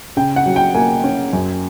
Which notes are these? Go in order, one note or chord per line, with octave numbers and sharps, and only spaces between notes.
C#3 G5
F#5
F#3
G5
A#3 G#5
C#4
F#2